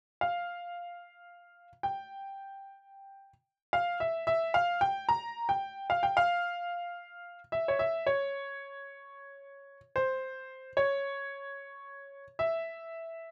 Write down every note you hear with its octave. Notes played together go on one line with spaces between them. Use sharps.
F5
G5
F5
E5
E5
F5
G5
A#5
G5
F5
G5
F5
E5
C#5
E5
C#5
C5
C#5
E5